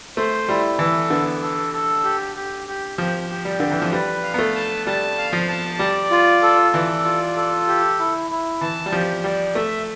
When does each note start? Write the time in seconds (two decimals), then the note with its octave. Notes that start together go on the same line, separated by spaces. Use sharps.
0.17 A3 C5
0.48 G3 E4
0.79 E3 A4
1.10 D3 B3
1.42 A4
1.73 A4
2.04 G4
2.36 G4
2.68 G4
2.98 F3 G4
3.30 G4
3.45 G3
3.60 D3 G4
3.71 E3
3.82 F3
3.92 G3 B4
4.23 F5
4.34 B3
4.38 A3
4.55 A5
4.86 G3 A5
5.18 F5
5.33 F3
5.49 A5
5.79 G3 D5
6.11 F4
6.43 A4
6.74 E3 D5
7.05 F4
7.36 A4
7.68 G4
7.99 E4
8.31 E4
8.61 E3 A5
8.86 G3
8.92 F3 G4
9.24 G3 D5
9.55 A3 E5